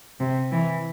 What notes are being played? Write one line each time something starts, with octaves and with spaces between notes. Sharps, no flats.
C3
E3